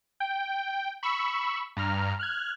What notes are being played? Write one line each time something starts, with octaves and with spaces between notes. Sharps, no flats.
G5
B5 C#6 E6
G2 A#5 F6
F6 F#6 G#6